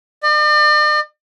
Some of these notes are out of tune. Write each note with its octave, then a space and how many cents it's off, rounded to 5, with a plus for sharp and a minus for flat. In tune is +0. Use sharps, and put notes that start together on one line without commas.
D5 +45